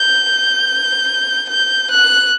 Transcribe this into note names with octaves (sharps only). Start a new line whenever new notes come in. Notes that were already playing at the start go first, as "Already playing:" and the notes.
Already playing: G6
G6
F#6